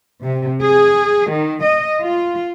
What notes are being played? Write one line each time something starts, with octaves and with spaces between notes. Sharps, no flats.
C3
G#4
D#3
D#5
F4